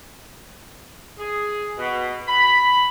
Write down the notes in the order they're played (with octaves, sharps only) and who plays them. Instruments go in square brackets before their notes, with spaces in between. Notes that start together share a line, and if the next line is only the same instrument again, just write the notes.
[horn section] G#4
B2
B5